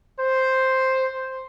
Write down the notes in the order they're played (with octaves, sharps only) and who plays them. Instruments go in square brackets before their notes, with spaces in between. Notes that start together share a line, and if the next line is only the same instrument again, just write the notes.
[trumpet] C5